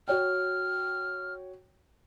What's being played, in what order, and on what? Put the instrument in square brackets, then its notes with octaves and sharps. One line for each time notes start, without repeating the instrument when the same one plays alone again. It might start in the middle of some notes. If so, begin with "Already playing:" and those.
[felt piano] F#4 C#5 G5 [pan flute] F6